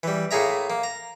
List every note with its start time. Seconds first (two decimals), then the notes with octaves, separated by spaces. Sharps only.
0.03 E3 G3
0.31 A2 A#3 G#4 E5 A#5
0.70 A#3
0.83 A#5